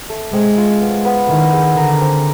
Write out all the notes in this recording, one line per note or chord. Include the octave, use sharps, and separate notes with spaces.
A3
G#3 C4
F4
B3
B3
D#3 E4
G#4
D3 A#4
C4